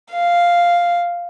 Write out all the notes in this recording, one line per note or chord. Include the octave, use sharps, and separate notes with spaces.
F5